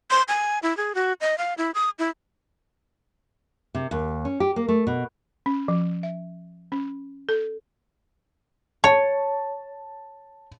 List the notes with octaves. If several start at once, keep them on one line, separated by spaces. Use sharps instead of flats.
C6
G#5
E4
G#4
F#4
D#5
F5
E4
D#6
E4
C3
D#2
C#4
G4
A#3
A3
B2
C#4
F3
E5
C#4
A4
C#5 A5